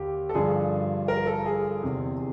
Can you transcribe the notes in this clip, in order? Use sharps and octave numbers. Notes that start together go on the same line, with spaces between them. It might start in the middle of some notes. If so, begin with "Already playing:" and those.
Already playing: D#2 D3 G4
A4
G2 D3 F3 G#4
A#4
A4
G#4
E2 C3 D#3